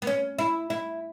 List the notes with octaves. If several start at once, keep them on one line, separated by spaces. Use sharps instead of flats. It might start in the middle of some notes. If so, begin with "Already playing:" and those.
B3
C#4
E4
E4